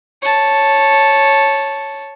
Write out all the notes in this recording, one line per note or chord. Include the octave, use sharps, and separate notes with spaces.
C#5 A5